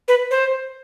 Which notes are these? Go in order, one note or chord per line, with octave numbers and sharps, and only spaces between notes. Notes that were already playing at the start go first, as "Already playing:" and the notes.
B4
C5